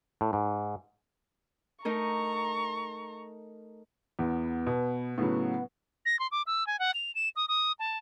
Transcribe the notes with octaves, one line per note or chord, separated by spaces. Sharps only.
A2
G#2
A3 D#4 A#4 A#5 C#6
E2 B3
B2
A2 C#3 F#3 B3
A#6
C6
D6
E6
G#5
F#5
F7
E7
D#6
D#6
A5